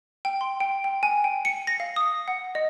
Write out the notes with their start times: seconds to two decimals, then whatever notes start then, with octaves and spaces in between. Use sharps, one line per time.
0.25 G5
0.41 C6
0.60 G5
0.84 G5
1.03 G#5
1.24 G5
1.45 C#7
1.67 A#6
1.80 F5
1.96 D#6
2.28 F#5
2.55 D#5